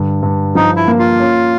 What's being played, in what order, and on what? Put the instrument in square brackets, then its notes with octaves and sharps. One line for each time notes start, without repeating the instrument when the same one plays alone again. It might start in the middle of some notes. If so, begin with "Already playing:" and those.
Already playing: [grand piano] G2 D3
G2
[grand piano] F3 [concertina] D#4
[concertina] E4
[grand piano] A#3
[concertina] F4
[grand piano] C#4